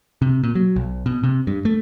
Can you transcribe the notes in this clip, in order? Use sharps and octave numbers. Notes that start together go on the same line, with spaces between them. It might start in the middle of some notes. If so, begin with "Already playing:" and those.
C3
A#2
F#3
B1
B2
C3
G2
A3